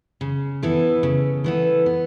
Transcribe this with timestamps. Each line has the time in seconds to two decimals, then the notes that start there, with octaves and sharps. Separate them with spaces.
0.21 C#3
0.63 E3 B3 E4 A4
1.03 C#3
1.44 E3 B3 E4 A4
1.86 B3